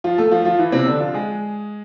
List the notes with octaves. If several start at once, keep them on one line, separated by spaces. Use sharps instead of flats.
F3 F4
A3 A4
F3 F4
F3 F4
E3 E4
C3 C4
D3 D4
F3 F4
G#3 G#4